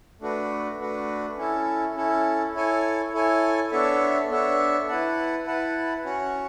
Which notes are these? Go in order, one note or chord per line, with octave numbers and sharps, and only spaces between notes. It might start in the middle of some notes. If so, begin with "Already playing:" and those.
A3 D4 F#4 B4
A3 D4 F#4 B4
C#4 E4 A4
C#4 E4 A4
E4 A4 C#5 G#5
E4 A4 C#5 G#5
B3 D4 A4 C#5 E5
B3 D4 A4 C#5 E5
E4 B4 F#5 A5
E4 B4 F#5 A5
C#4 F#4 C#5